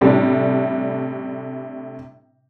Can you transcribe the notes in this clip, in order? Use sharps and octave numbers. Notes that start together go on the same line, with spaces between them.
A2 C3 G3 C#4 D4